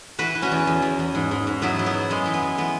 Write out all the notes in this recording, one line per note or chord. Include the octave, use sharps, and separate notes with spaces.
E3 F#4 B4
E3
C#4 F#4
E2
E2
E2
E2
G#2
G#2
G#2
F#3 B3 E4
F#3
B3
F#3
F#2 G#3
E3
B3
E3
E3 B3